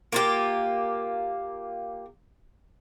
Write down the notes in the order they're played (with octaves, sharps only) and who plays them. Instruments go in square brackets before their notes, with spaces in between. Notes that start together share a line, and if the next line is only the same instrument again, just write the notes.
[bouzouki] A#3 F4 G4